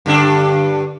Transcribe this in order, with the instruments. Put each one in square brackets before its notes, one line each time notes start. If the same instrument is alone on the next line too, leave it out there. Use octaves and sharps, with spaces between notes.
[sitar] G2 D3 D4